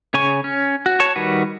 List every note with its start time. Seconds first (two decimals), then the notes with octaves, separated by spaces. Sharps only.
0.14 C#3 C#5 G#5 C#6
0.44 C#4
0.86 F#4
1.00 C#5 A5 C#6
1.16 D#3 G3 F#4 B4